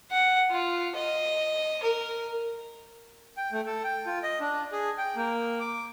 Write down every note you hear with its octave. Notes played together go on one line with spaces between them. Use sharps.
F#5
F4
D#5
A#4
G5
A3
A4
G5
F4
D#5
D4
G#4
G5
A#3
D6